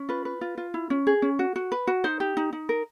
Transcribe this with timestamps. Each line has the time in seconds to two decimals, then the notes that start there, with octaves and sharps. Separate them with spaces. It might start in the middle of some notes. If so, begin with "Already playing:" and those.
Already playing: C#4
0.09 F4 B4
0.25 B4
0.41 F4
0.58 F4
0.74 E4
0.90 C#4
1.07 G#4
1.22 C#4
1.39 F#4
1.56 F#4
1.72 B4
1.87 F#4
2.04 D#4 C5
2.20 G4
2.37 D#4
2.53 D#4
2.69 A#4